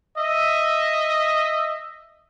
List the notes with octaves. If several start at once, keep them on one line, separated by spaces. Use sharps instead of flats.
D#5 E5